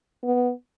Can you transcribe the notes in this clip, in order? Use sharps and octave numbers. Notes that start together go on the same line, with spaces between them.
B3